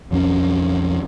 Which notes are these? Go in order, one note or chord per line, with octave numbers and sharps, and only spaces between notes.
B1 F2 G3 C#4